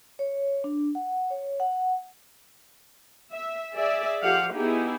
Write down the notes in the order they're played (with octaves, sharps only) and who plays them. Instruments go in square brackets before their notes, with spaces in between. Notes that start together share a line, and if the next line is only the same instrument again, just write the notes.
[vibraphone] C#5
D4
F#5
C#5
F#5
[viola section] E5
G#4 D5 E5
F3 G4 A4 F5 F#5
B3 D#4 E4 G4 G#4